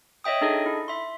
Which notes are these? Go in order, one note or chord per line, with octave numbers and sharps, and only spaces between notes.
C#5 D#5 E5 G5 D#6
D4 D#4 G#4 A4 D#5
E4
E5 C6